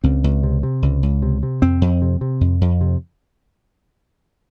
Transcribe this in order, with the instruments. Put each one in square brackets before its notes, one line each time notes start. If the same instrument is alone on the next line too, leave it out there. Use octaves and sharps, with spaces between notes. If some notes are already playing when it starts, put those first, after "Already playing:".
[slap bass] C#2 C4
C#2
C3
C3
C#2
C#2
C3
C3
F2 C4
F2
C3
C3
F2
F2
C3